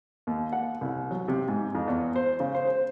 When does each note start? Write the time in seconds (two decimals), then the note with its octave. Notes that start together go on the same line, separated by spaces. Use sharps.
0.27 D#2
0.53 F#5
0.81 C2
1.11 F#3
1.28 C3
1.48 G#2
1.75 F2
1.88 E2
2.16 C5
2.40 C#3
2.55 C5
2.67 C5